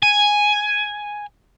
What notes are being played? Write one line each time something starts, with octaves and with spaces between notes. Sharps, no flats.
G#5